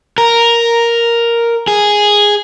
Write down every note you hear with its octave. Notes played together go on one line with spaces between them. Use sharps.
A#4
G#4